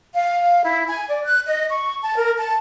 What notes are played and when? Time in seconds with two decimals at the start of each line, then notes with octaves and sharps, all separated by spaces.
0.15 F5
0.63 E4
0.89 G#5
1.09 D5
1.25 F#6
1.47 D#5
1.71 C#6
2.03 A5
2.17 A#4
2.38 A5